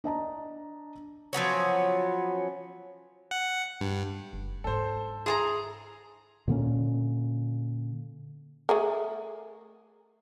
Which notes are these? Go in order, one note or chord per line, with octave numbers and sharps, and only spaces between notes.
D4 D#5 A5 A#5
F3 F#3 B3 C#4
F#5
G2
F#1
G#2 D4 A4 C5
G#4 A5 A#5 C6
A#2 D3 A#3 C#4
A3 G#4 A#4